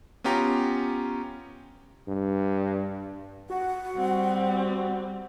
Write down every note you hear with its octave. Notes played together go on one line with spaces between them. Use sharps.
B3 C#4 F4 G4 A#5
G2
F#4 F#5
G3 C4